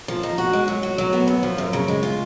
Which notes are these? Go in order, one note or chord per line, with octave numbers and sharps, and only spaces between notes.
F3
D#4
F#4
G#3
F#3
F#4
F#3
B3
F#2
F3
F#2
C#3
G#3
F4